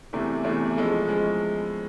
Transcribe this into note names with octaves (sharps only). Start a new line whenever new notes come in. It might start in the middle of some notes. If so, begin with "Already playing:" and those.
E2 C3 E3 A3
E2 C3 E3 A3
F3 G#3 C#4 E4 A4
F3 G#3 C#4